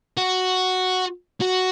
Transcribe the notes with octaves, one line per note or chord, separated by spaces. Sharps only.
F#4
F#4